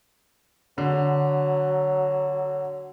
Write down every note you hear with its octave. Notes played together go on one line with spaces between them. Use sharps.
D3 F#3